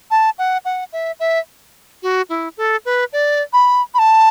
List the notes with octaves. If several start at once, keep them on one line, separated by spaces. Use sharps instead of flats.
A5
F#5
F#5
E5
E5
F#4
E4
A4
B4
D5
B5
B5
A5